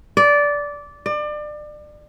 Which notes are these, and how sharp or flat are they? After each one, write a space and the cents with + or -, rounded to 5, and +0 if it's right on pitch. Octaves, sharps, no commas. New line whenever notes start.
D5 -15
D5 +30